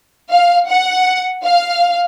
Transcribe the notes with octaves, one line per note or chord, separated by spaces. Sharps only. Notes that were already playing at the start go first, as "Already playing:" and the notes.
F5
F#5
F5